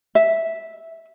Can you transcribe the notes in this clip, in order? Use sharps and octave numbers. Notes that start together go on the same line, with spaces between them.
E5